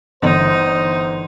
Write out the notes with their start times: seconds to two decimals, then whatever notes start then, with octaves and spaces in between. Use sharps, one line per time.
0.22 G1 D3 E3 D#4 C5